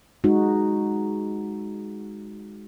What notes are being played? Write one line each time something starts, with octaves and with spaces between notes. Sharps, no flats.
G#3 D#4 F#4